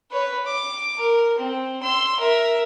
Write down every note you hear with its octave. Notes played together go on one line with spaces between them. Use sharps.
B4 C#5
D6
A#4
C4
C6 E6
A#4 E5